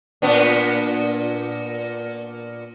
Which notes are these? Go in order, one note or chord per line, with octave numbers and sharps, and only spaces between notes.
A#2 B3 D4